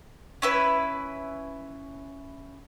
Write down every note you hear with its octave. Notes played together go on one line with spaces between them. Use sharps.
C#4 E4 B4